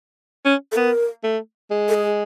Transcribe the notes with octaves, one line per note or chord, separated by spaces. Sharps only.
C#4
A4
B3 A#4
A3
G#3
A4
G#4